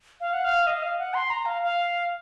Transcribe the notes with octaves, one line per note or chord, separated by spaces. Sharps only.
F5
F#5
F5
D#5
F5
F#5
C6
A#5
F5
F5